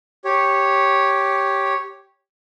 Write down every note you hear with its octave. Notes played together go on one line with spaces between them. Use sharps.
G4 C#5